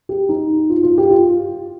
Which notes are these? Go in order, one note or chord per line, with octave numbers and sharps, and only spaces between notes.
G4
D#4
F4
F4
G4
F4